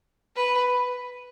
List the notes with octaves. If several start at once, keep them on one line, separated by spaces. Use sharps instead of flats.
B4